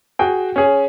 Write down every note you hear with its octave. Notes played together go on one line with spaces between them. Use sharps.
F#4 G#4 G5
C#4 G#4